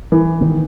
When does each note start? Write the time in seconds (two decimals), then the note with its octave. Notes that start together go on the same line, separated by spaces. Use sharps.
0.12 E3
0.40 D#3 A#3